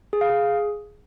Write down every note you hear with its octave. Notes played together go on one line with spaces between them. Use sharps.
G#4
F5
G#4